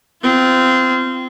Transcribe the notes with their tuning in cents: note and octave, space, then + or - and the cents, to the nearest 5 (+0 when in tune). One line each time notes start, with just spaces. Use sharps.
C4 -20 F4 -20